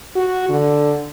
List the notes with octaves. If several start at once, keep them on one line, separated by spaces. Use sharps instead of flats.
F#4
D3